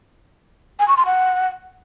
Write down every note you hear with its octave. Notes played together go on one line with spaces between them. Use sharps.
G#5
C#6
C6
F#5